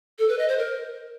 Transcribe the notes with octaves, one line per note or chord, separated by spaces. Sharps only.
A4
B4
D#5
C5
A#4